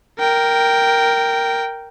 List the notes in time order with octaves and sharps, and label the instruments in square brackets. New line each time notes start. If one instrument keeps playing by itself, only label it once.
[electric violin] A#4 G5